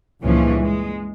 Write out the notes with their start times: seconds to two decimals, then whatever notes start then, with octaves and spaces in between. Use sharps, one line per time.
0.22 C#2 G2 A#2 E3 F3 C#4
0.62 G#3